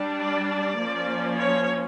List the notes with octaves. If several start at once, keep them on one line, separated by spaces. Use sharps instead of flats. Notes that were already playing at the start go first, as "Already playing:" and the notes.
Already playing: G3 D4
D5
D5
F3 A#3 C#4
C#5